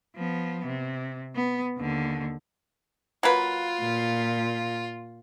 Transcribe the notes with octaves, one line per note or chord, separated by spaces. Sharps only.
F3 B3
C3
B3
D#2 D3
F#3 A#3 F4 B4
A#2